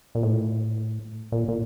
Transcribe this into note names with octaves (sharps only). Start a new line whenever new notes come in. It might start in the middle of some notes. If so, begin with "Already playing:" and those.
A#2
A2
A#2
A#2